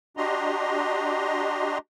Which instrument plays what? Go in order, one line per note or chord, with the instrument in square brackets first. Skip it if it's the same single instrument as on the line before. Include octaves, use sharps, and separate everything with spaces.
[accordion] D4 F#4 G4 D#5 A#5 C6